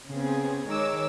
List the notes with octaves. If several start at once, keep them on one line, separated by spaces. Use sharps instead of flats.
C#3 B3 C4 G#4
D#3 G#3 A#4 C#5 D6 E6